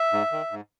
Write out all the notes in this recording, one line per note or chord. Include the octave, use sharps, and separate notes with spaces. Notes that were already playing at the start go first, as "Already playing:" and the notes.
Already playing: E5
G#2
D#3
G#2